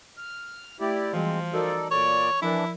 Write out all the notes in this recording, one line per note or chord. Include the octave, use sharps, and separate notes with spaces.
F6
A3 E4 G4 D5
E3 F3 G3 G#3 C4 F#4
D#4 F#4 A4 A#4 D5 D#5
A#2 A4 C#5 D5
E3 F3 D4 E4 A#4 D5